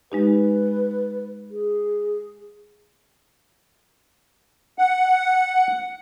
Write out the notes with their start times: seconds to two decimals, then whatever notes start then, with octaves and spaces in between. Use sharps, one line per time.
0.12 G#3 D#4 G4 B4
1.51 G#4
4.78 F#5